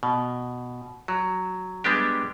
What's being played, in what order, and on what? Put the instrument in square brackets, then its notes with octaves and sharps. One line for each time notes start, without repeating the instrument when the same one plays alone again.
[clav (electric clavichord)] B2
F#3
G3 G#3 B3 D4 G4